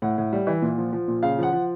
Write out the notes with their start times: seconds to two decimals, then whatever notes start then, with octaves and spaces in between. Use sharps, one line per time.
0.02 A2 F#5
0.18 A2
0.33 G3
0.47 E3
0.62 A#2
0.78 F3
0.93 F3
1.08 A#2
1.23 C#3 F5
1.38 F3 F#5
1.53 F3